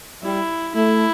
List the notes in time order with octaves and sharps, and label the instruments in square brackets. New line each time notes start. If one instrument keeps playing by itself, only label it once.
[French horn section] G3 [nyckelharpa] E4
[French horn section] A3 [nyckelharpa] E4